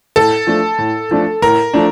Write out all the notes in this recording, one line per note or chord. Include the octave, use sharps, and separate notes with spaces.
A2 A4
F3 A3 D4
A2
F3 A3 D4
A2 A#4
F3 A3 D4